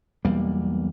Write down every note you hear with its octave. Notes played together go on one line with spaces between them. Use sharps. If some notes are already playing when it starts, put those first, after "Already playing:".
B1 E2 G3 A#3